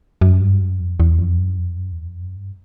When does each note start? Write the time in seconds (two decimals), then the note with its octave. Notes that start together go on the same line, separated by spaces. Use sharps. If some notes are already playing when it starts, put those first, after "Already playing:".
0.21 F#2
0.41 G2
0.61 F#2
0.80 F2
1.00 E2
1.19 F2
1.39 F#2
1.58 F2
1.78 F#2
1.92 E2
2.07 F2
2.22 F#2
2.36 G2